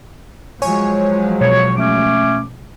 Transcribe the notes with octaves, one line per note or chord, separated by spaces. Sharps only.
F3 F#3 G#3 C#5 G#5 C#6
B2 C#5
A3 C#4 D6